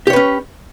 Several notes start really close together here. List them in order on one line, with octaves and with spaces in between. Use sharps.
G4 C#5 B4 C#4